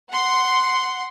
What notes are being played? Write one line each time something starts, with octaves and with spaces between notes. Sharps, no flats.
F#5 C6